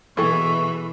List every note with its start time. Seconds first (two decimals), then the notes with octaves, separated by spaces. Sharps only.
0.17 B2 E3 E4 G#4 A4 C#6